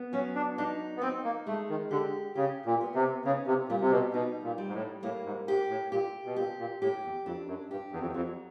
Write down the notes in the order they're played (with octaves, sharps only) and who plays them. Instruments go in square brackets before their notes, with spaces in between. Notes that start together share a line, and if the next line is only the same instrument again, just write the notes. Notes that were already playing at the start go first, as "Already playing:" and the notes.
Already playing: [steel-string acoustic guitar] B3
[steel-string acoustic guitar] F#3 [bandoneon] C#4
[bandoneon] D4
[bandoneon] D4 [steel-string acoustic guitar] D#4
[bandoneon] B3
[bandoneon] C4 [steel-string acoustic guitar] D#4
[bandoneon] A#3
[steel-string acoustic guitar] G#3 [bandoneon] A3
[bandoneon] D#3
[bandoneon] D3 [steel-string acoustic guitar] G4
[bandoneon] C#3 [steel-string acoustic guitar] G4
[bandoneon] A#2
[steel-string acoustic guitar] B3
[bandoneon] C3
[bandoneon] C#3 [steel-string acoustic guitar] D#4
[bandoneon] C3
[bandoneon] A#2 [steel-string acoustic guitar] G3
[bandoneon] C3
B2
[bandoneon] B2 [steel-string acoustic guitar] D#4
[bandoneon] A#2
[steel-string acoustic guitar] G3
[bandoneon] G#2
A2
[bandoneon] A2 [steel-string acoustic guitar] A#3
[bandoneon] G#2
[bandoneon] G#2 [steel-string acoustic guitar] G4
[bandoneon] A2
[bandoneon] A#2 [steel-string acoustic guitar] G4
[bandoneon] B2
[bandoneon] A#2 [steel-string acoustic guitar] G4
[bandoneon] A#2
[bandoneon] A2 [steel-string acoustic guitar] G4
[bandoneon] E2
[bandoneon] F2 [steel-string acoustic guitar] D4
[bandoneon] F#2
[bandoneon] G2 [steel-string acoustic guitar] G4
[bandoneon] E2
F2
E2
[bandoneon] F2 [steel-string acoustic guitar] F#3